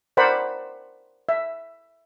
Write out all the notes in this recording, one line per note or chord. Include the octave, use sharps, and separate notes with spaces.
A#4 C5 D5 F#5 B5
E5